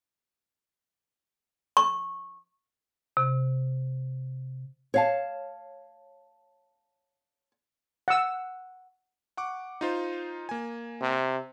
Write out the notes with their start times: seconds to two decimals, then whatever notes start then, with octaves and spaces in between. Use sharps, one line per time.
1.77 C#6
3.17 C3
4.94 C#5 F5 A5
8.08 F#5 E6
9.37 F#5 C#6 D6
9.81 D#4 F4 C5
10.49 A#3 G#5
11.01 C3